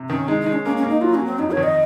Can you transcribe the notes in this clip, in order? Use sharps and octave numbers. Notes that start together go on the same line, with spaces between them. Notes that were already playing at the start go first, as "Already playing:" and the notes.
Already playing: C3
D#3 C#4
G#3 D#4
D#4
G#3
C#4
A#3 C#4
C#4
A#3
D#4
F#3 F4
F#3 C#4
C4
F2 D#4
C#5
D#3
D#5